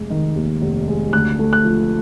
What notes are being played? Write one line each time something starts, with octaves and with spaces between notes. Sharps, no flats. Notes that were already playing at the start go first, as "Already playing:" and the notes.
Already playing: F1 G#3
D#3
D#2
F1
G#3
D2 F#6
A3
F#6
F3